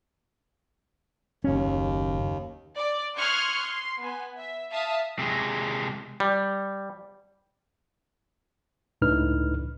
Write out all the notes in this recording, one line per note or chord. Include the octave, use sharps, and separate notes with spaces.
F#1 D#2 C#4
D5
C6 C#6 D#6 F6 F#6 G#6
C6
B3 G#5
E5
E5 F5 A5 D#6
C3 G#3
G3
C#2 A2 D4 D#4 B4 F6